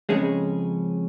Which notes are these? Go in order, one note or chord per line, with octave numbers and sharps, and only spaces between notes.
F2 C#3 G#3 C#4 G#4